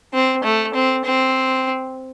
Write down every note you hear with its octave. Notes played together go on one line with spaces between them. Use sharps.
C4
A3
C4
C4